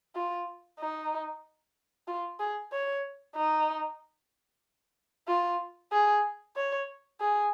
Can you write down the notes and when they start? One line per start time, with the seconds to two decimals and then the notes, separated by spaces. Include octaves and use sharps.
0.15 F4
0.79 D#4
2.07 F4
2.40 G#4
2.72 C#5
3.35 D#4
5.28 F4
5.92 G#4
6.56 C#5
7.20 G#4